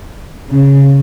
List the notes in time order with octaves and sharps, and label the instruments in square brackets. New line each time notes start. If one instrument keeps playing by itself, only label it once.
[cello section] C#3